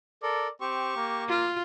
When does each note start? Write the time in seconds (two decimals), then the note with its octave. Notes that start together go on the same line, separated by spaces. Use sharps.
0.22 A4 A#4 D5
0.61 C4 G4 C#6
0.97 A#3
1.29 F4